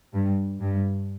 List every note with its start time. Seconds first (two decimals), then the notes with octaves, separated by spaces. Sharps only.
0.14 G2
0.61 G2